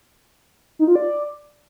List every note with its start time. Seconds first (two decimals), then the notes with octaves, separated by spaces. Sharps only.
0.79 D#4
0.87 F4
0.96 D5